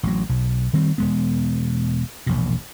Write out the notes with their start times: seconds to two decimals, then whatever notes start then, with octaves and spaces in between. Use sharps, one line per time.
0.03 A1 F#3
0.29 B1
0.73 D#3 G3 C4
0.98 E1 G#3 B3
2.26 E1 A#1 A#2